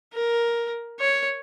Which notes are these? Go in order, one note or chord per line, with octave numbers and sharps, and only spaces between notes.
A#4
C#5